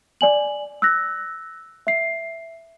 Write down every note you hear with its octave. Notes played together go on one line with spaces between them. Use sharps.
D5 G#5 F#7
E6 F#6 A#6
E5 C7